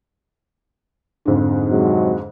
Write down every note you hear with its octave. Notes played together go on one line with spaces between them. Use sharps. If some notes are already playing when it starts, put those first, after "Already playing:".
F2 G#2 D3
C3 F#3 G#3